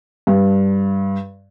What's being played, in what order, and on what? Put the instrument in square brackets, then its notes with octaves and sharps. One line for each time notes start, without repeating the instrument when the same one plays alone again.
[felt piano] G2